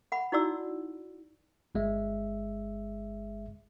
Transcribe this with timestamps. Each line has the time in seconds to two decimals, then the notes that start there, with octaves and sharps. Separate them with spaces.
0.12 F#5 B5
0.32 D#4 E4 F#4 D5 E6
1.75 G1 G#3 E5